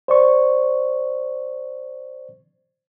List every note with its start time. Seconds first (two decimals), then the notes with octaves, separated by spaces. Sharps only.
0.08 C5 D5 C#6